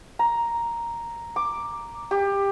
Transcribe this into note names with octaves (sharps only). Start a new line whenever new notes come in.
A#5
D6
G4